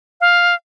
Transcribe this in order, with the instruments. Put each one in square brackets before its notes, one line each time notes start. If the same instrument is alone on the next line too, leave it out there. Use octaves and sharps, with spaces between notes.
[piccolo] F5